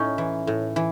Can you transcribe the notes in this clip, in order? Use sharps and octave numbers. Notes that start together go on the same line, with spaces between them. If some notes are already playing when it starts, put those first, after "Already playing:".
Already playing: A2 C#4 D#4
E3
A2
E3